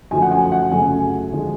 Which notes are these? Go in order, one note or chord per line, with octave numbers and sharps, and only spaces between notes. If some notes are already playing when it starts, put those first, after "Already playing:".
F#2 D3 F3 A3 G#5
F#5
G#5
F#5
F#2 C#3 F#3 A3 G#5
D3 F3 G#3